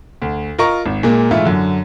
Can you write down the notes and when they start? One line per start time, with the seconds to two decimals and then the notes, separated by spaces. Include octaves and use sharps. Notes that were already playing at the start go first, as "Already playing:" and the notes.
0.22 D2
0.58 F4 A#4 D#5 A#5 C#6
0.86 G#1
1.03 A#2 G#3 A#3
1.31 G#2 E3 G#3 A3 E4 F4
1.45 F#2 D3